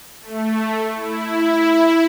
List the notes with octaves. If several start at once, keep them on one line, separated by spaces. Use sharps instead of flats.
A3
E4